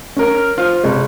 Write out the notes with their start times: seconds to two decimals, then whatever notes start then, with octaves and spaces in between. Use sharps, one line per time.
0.16 C#4 A#4
0.35 F6
0.58 F4 C5 F6
0.84 G1 C3 G#3